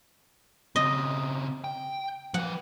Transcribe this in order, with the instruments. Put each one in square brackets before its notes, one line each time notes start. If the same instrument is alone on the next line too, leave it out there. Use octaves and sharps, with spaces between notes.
[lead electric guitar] C#3 C4 [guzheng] D#5
[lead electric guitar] G5
[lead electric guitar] F3 B4 [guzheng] F#5